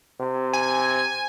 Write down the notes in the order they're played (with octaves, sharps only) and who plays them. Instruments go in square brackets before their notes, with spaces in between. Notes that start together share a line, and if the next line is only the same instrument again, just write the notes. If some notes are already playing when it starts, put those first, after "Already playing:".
[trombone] C3
[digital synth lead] G#5